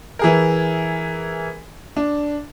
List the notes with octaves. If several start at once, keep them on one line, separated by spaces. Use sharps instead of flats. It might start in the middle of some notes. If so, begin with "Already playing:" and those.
E3 G#4 A#4
D4